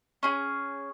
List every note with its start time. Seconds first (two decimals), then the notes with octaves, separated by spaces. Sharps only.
0.23 C#4 G#4